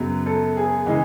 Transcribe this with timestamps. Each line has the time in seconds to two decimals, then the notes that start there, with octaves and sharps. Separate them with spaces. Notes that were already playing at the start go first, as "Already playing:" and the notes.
Already playing: F#2 C#3 F#3 B3
0.26 A4
0.57 G#4
0.86 C#3 E3 G#3 G#4